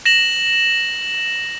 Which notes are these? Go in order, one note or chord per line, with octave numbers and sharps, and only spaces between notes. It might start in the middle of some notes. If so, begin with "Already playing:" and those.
A#6 E7 F#7